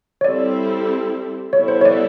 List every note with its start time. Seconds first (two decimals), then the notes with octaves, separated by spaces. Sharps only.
0.21 C#5
0.25 G3 C4 E4 A4 D5
1.53 G3 B3 E4 A4 C#5
1.68 C5
1.81 C#5
1.85 D5